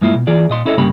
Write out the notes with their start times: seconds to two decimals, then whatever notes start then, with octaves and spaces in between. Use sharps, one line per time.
0.01 G2 G#3 A#3 E4 F4
0.15 B2
0.27 E3 F4 G#4 D5
0.50 A#2 D#5 C6
0.65 C#4 E4 A4 C#5 D#5
0.78 C2 G2 C#3 A#3 G4 B5